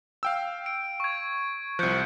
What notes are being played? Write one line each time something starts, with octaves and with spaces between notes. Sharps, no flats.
F5 G5 E6
D7
C#6 G#6
C2 F3 F#6 G6 C#7